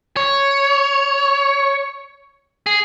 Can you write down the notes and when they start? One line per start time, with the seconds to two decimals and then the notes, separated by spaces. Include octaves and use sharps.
0.17 C#5
2.66 G#4